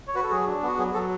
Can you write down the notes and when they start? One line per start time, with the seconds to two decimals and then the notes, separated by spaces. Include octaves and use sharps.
0.07 C#5
0.15 F#4 B4
0.24 A4
0.31 F#3 G#4
0.47 D4
0.63 B3 F#4
0.78 F#3 G#4
0.94 F#3 A4